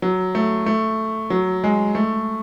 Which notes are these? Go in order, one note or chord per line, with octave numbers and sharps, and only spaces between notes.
F#3
A3
A3
F#3
G#3
A3